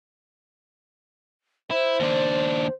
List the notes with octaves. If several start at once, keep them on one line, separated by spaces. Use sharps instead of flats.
E4 C5
D#2 D4